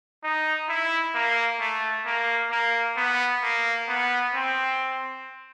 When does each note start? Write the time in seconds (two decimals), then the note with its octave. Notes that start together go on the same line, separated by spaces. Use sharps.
0.23 D#4
0.69 E4
1.14 A#3
1.60 A3
2.05 A#3
2.51 A#3
2.97 B3
3.42 A#3
3.88 B3
4.34 C4